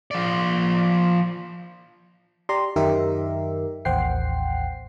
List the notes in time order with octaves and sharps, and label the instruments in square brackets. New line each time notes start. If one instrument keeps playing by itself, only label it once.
[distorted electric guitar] F3 D5
[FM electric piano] G4 D5 A#5 C6
F#2 D#3 D#4 G4 A#4 E5
A1 D#2 C5 F#5 G5 C7